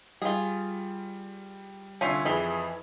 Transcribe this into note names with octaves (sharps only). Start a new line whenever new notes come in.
G3 F4 G#4
C2 D3 C#4 F4 E5 G#6
F2 E3 G#4